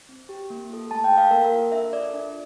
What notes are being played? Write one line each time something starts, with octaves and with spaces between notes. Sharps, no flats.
C4
G4
A#3
F4 A4
A3 A5
G5
E4 A4
F5
A#3 A#4
A#4
F4 A4
D4 E5
F4 A4 D5
D4